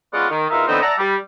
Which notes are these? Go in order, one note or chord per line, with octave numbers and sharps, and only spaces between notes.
G#3 B3 C#4 F4 D5 F#5
D#3
E2 D#4 F4 A#4 E5 F5
D3 E3 B3 C4 D#4
D5 E5 F#5 A5 A#5
G3